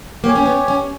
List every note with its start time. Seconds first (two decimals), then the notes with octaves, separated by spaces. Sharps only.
0.23 A#3 G4 C#5 G#5
0.35 C#4
0.46 B3
0.68 C#4